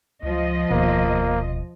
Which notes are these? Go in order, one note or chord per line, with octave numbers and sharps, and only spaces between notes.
C#2 F3 D#5
F1 D#2 B2 A#3